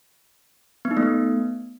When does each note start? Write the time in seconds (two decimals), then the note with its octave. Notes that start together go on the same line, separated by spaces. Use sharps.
0.85 B3
0.91 D#4
0.97 A3
1.03 B3